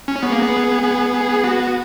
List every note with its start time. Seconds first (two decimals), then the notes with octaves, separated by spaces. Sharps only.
0.08 C#4
0.23 B3 G#4
0.32 A#3
0.41 B3
0.83 B3
1.14 G#4
1.44 B3 F#4